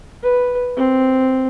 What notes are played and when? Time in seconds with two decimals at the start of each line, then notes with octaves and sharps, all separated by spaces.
0.23 B4
0.77 C4